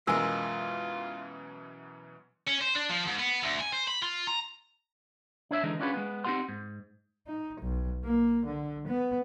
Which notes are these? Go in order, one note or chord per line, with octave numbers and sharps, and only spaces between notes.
F#2 B2 E3 G#3 F4 A#4 G#5 E6
C#4
C5
D4
F3
G#2
B3
D2
G#5
C5
B5
F4
A#5
D4 C#5 E5
D3 E3 G#3 D#4
C#4 D4 F4 F#4 G#4 B4
G#3 B3
C4 D#4 F4 G4 F#5 C6
G#2
D#4
B1
A#3
D3
B3